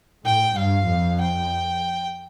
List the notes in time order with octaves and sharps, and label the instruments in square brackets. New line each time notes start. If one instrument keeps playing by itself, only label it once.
[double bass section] A2 [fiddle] G5
[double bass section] G2 [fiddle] F5
[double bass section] F2
[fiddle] G5